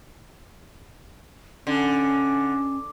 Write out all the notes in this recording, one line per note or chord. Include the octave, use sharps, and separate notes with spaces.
D3 C#4